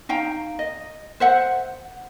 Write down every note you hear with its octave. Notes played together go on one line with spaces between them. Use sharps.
D#4 F5 G5 A#5
D#5
C5 E5 F#5